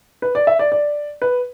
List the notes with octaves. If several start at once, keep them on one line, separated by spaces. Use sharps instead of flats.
B4
D5
E5
D5
D5
B4